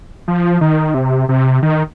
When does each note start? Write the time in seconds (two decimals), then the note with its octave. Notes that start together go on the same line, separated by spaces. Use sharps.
0.28 F3
0.61 D#3
0.94 C3
1.29 C3
1.63 D#3